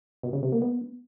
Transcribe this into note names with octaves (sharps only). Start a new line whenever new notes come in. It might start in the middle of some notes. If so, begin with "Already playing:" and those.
B2
C#3
C3
A#3
B3